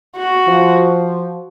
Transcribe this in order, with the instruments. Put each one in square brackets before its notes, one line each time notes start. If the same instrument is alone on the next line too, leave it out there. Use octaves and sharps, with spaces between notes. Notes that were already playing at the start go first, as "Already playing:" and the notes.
[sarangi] F#4
[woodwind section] F3